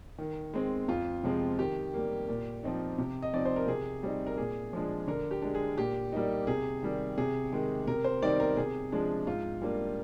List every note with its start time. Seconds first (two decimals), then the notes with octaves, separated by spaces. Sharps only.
0.18 D#3
0.54 G#3 C4
0.88 F2 F4
1.23 C3 F3 G#3 C4
1.58 D#3 G4
1.94 G3 A#3
2.28 A#2
2.63 F3 C4 D#4
2.98 C3
3.22 D#5
3.33 F3 C4 D#4 D5
3.45 C5
3.56 A#4
3.68 C3 G#4
4.03 G3 C4 D#4
4.27 A#4
4.38 A#2 G#4
4.73 F3 G#3 D4
5.08 D3 A#4
5.31 G4
5.42 G#3 D4
5.55 G#4
5.78 A#2 G4
6.12 G3 A#3 D#4
6.47 C3 G#4
6.83 D#3 G3
7.18 C3 G#4
7.53 D#3 G#3
7.87 C3 A#4
8.04 C5
8.22 D#3 G3 C4 D#4 D5
8.40 A#4
8.57 C3 G#4
8.92 F3 G#3 D4
9.27 G#2 F4
9.62 G3 A#3 D4